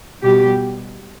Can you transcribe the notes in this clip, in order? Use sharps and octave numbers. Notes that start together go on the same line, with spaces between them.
B2 G3 G4